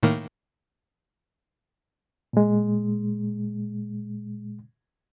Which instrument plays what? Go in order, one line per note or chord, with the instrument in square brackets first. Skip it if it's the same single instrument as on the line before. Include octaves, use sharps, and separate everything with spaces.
[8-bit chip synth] A2 D#3 A#3
[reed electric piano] A#2 G#3